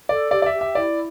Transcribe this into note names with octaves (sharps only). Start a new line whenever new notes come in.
A4 D5
G4 D5
D5
E5
G4
E5
E4 D5